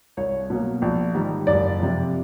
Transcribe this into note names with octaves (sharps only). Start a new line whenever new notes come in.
C2 C#5
B2 F#3 A#3
A#1
G#2 D#3 G3
F#1 D5
F2 C3